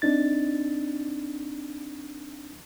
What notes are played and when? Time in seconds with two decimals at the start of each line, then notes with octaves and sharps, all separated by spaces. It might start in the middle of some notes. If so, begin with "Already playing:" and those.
0.02 C4 D4 D#4 A6